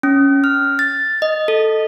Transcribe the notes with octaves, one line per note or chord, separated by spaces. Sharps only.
C#4
F6
A6
D#5
A4